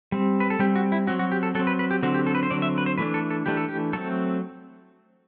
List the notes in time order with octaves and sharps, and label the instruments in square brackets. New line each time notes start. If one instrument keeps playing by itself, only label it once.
[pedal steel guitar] G3 C4
B4
A4
G3 C4 G4
F#4
E4
F#3 C4 F#4
F#4
G4
A4
F#3 A4
C4
B4
B4
G4
D3 F#3 C4 F#4
G4
A4
B4
C5
D3 F#3 C4 D5
E5
B4
C5
E3 A3 D4 B4
A4
A4
E3 A3 D4 G4
A4
G4
F#3 A3 C4 A4